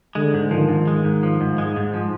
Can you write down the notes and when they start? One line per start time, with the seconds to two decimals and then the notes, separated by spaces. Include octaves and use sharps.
0.15 D3 G#3
0.34 G#2
0.51 D#3 F3
0.69 G#2
0.87 G#3
1.04 G#2
1.23 F3
1.41 G#2
1.58 G#3
1.76 G#2
1.94 F3